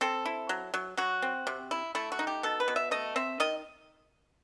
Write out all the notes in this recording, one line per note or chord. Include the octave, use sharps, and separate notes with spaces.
C4 A4
E4
F#3
F#3
F#3 F#4
C4
C3
E4
A3 E4
F#4
D#4
G4
B2 A4
B4
B2
E5
A3 D#5
C4 E5
D#3 D#5